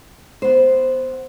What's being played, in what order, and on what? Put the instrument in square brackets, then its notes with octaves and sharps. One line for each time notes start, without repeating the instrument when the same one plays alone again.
[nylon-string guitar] B3 C5